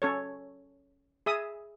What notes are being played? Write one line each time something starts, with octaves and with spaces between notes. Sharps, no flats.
C#4 A4 C#5
G#4 E5 D#6